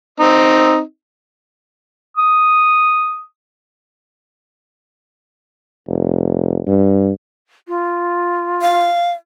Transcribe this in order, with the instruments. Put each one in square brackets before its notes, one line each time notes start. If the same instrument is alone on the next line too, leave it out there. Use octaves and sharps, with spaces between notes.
[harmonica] C4 D#4
[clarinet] D#6
[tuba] F1
G2
[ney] F4
[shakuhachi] F5